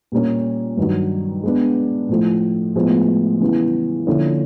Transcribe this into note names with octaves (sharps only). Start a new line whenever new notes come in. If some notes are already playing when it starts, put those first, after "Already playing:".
A#2 G3 A#3 C#4
G2 D#3 F#3
G#3 B3 D4
A2 F3 A3
A2 F3 G#3 B3
C#3 E3 G3 B3
D3 F3 A#3 C#4 E4